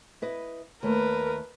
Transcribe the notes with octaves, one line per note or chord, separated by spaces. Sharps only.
E4 B4 D#5
D#2 A3 A#4 B4